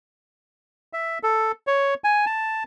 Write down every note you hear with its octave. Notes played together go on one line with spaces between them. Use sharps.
E5
A4
C#5
G#5
A5